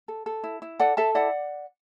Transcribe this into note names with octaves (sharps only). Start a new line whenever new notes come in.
A4
A4
E4
E4
A4 D5 F#5
A4 E5 A5
E4 D5 F#5